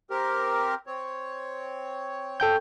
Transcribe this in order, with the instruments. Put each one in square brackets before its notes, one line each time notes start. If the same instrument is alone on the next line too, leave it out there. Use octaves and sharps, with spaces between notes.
[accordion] C4 G4 A#4
C4 C#5
[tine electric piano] A4 G5 G6